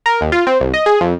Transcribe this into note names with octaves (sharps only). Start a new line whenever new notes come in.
A#4
D#2
F4
C4
C2
D#5
G#4
F2